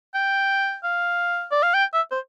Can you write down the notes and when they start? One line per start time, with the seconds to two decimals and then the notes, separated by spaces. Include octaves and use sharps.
0.15 G5
0.84 F5
1.52 D5
1.63 F5
1.74 G5
1.94 E5
2.12 C5